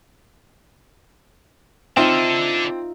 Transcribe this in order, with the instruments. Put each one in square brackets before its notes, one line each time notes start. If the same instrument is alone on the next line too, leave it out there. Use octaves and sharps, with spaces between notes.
[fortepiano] C4 [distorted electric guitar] D4 A4 [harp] D#4 F4 E5